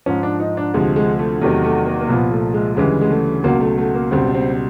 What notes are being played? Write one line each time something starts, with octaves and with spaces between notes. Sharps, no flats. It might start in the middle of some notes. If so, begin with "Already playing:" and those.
G#2 F3 C#4
D4
D#4
D4
D2 C3 F3 G#3
G#3
A3
E2 C3 D#3 F#3 A3
A3
A#3
A#3
C2 A#2 F3 B3
A3
G#3
D2 C#3 E3 G3 G#3
G#3
A3
C#2 B2 F#3 A#3
A3
A3
A#3
C#2 B2 G3 C4
C4